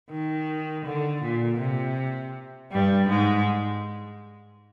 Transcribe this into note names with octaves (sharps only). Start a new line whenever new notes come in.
D#3
D3
A#2
C3
G2 G3
G#2 G#3